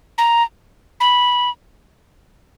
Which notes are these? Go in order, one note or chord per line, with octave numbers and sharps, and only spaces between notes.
A#5
B5